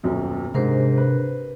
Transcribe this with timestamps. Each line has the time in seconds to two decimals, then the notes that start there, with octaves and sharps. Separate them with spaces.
0.03 D#1 F#2 B2
0.54 G#2 C3 D4 A#4 C5
0.98 B4